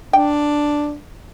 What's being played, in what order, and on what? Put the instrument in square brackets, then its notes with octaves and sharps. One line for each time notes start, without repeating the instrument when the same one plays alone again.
[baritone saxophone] D4 [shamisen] G5